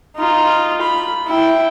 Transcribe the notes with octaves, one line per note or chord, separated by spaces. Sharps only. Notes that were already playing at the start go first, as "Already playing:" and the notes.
D#4 F4
B5
E4 G5